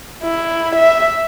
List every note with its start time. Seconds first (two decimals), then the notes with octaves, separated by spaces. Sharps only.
0.24 E4
0.75 E5